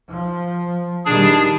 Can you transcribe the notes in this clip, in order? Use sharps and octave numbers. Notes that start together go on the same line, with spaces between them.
F3
A#2 D#3 G3 D4 G#4